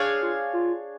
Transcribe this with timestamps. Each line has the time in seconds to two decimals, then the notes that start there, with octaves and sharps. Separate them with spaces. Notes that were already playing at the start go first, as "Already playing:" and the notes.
Already playing: D4 G#4 C#5 F5
0.22 F4
0.53 F4